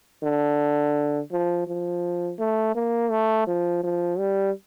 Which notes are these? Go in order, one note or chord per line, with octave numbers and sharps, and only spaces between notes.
D3
F3
F3
A3
A#3
A3
F3
F3
G3